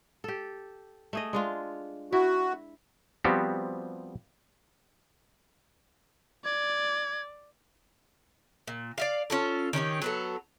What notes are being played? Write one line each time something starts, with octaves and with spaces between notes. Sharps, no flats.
G4 A4
A3 G#4 D#5
G#3 D4 F4
E4 F#4
F3 G3 B3 C4 F#4 G4
D5 G#6
A#2
D5 E5 F5
C#4 F4 A4
D#3 C#4 D#4 G4
F#3 B3 A4